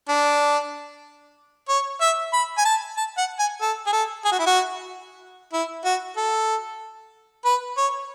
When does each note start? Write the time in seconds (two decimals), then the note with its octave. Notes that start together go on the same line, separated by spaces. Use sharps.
0.09 D4
1.69 C#5
2.01 E5
2.33 B5
2.58 G#5
2.65 A5
2.97 A5
3.18 F#5
3.39 G#5
3.62 A4
3.86 G#4
3.93 A4
4.25 G#4
4.32 F#4
4.39 E4
4.46 F#4
5.53 E4
5.85 F#4
6.17 A4
7.45 B4
7.77 C#5